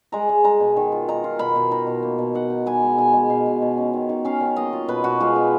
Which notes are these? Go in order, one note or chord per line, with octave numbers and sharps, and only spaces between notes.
G#3 A#5
G#3
G#3 A#5
B2
D#3
F4
D#3 A#5
F4
B2 B5
B2
D#4 A#5
B2
A#3
B2
D#4 F#5
D#4
B3 G#5
G#3
B2 G#5
G#3
B2 F5
B2
B2
C#4
D#3
D#3
C#4 F5
D#3
A#3 D#5
F4
B2 B4
B2 F#4
G#3 F4
B3